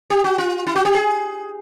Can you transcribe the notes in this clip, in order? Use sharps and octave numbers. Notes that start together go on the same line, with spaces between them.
G4
F#4
F4
E4
F#4
G4
G#4